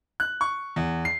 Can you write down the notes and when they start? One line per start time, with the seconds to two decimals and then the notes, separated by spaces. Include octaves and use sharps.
0.20 F#6
0.41 C#6
0.76 E2
1.05 C7